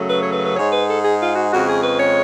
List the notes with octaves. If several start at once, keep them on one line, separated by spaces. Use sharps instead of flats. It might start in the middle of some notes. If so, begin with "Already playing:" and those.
Already playing: F#2 C#3 F#3 A3
B4
C#5
B4
B4
G#2 G#3 C#5
B4
A4
G#4
F4
F#4
F2 C#3 G#3 F#4
G#4
B4
C#5